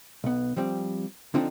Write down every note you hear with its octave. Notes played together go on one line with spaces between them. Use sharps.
B1 B3
F3 G3 C4
D3 F3 C4 D4 D#4